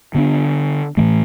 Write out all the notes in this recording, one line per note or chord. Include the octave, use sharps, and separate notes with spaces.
D3 B3 D4
A2 E3 A3